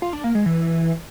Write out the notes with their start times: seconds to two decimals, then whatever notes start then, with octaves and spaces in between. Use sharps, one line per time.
0.02 F4
0.13 D4
0.24 A#3
0.35 G#3
0.46 E3